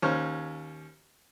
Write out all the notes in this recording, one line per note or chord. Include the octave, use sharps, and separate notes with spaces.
D#2 C#4 C5 C#6 F6